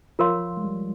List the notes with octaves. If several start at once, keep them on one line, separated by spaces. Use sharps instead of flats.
F3 F4 A#4 C#5 F5 C6
G#3
G3